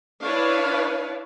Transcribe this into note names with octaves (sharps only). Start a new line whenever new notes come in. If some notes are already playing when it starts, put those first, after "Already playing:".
D4 E4 B4 C#5 F5